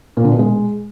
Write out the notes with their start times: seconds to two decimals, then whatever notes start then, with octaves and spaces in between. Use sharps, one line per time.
0.17 A#2
0.24 D3
0.32 B2
0.39 G#3